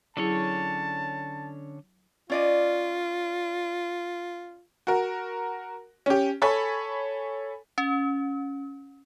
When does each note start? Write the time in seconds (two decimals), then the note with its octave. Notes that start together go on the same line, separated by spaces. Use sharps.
0.17 D3 F#3 C#4 E4 G#4 C#5 A5
2.30 C#4 F4 D5 D#5
4.87 F#4 A#4
6.06 C#4 G4
6.42 A4 C#5 G#5 B5
7.78 C#4